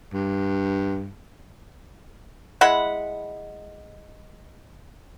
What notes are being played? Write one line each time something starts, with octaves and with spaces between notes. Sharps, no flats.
G2
G#3 E4 F#5 B5